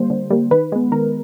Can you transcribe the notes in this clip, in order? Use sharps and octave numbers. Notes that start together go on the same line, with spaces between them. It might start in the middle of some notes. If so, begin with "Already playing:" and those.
Already playing: D3 G3 A#3 C5
D3
G3 A#3
D#3 B4
G#3 B3
D#3 A#4